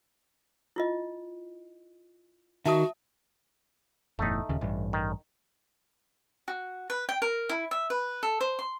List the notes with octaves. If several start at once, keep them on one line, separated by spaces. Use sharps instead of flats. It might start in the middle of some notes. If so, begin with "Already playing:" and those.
E4 F4 D#5
D#3 F#4 E5 A5 D#6
F#1 E2 A2 A3 D#4
D#1 D#2 C#3
A1 G2
D#3
F#4
B4
G5
A#4
E4
E5
B4
A4
C5
C6